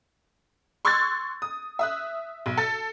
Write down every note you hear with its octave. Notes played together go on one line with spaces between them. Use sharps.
C6 C#6 E6 F#6 G#6 A6
D#6
E5 D#6 F#6
B1
A4 A6